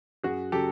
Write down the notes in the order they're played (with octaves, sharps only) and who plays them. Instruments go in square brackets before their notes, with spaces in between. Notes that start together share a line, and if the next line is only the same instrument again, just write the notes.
[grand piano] F#2 F#4 G#4
C#3 F#3 G4 A4